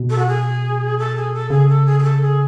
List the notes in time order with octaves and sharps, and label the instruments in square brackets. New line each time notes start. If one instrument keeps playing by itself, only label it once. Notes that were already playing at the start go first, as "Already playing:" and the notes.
Already playing: [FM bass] B2
[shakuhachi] A4
F#4
G#4
A4
G#4
A4
[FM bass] C#3 [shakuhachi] G#4
[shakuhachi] A4
G#4
G#4
A4
G#4